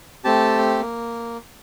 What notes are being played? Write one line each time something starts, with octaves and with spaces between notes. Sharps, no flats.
A3 C4 G4 A5
A#3